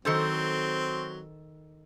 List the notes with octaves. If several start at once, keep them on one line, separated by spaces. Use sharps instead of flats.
D#3 F#3 C4 A4 C5